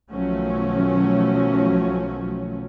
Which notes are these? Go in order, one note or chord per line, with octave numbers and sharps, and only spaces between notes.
B1 D#3 F3 F#3 A3 C#4